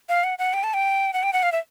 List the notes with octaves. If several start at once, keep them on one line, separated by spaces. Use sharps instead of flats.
F5
F#5
F#5
G5
A5
G5
F#5
G5
F#5
F5
E5